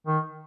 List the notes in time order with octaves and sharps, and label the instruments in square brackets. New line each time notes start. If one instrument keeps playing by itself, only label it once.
[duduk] D#3